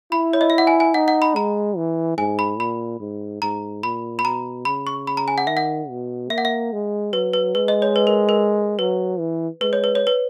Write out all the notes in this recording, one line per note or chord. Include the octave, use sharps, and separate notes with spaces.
E4 B5
C#5
D#5
E5
F#5
G#5
G#5
D#4 F#5
F#5
B5
G#3 A#5
E3
G#2 G#5
B5
A#2 B5
G#2
G#2 A#5
A#2 B5
B5
B2 A#5
C#3 B5
C#6
B5
A#5
G#5
F#5
D#3 E5
F#5
B2
A#3 E5
F#5
E5
G#3
F#3 B4
B4
G#3 B4
D#5
C#5
B4
A#4
A#4
F#3 B4
E3
G#3 B4
C#5
B4
C#5
B4